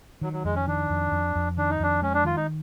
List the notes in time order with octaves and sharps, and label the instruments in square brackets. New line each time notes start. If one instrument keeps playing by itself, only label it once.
[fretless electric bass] D#3 [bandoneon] F#3
[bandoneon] F#3
[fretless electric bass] F2 [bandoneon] G#3
[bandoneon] C#4
[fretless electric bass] D#3 [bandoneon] D4
[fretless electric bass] F2
F2
F2
[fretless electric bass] D#3 [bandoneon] D4
[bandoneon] D#4
[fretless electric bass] F2 [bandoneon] D4
[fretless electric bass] G#3 [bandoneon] C#4
[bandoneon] D4
[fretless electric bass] D#3 [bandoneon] F4
[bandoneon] D#4